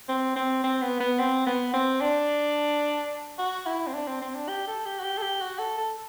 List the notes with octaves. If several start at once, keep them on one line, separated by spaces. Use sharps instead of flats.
C4
C4
C4
B3
B3
C4
B3
C4
D4
F#4
E4
C4
D4
C4
C4
D4
G4
A4
G4
F#4
G4
A4
G4
F#4
A4
A4